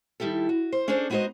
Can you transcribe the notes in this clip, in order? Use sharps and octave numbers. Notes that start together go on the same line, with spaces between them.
D#3 G3 E4 G4 A4
F#4
C5
C#4 D4 G#4 A4 C5 D5
G#3 B3 D#4 F#4 C5 D#5